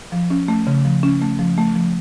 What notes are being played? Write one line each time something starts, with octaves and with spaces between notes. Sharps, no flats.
F3
C#4
A3
C#3
F3
C#4
A3
F3
A3
F3